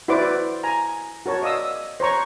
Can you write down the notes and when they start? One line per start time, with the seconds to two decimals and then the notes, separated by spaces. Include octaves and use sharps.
0.08 E4 F#4 B4 C5 D5 D6
0.63 G#5 A#5
1.26 F#4 A#4 C#5 A5
1.42 D5 D#5 F5 D#6 E6
2.00 C5 C#5 A#5 C#6